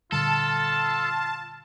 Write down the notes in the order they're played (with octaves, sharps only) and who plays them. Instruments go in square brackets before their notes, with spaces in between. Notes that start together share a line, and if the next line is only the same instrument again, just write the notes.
[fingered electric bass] A#2 D3 G3 [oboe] F4 [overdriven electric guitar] A4 [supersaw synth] A5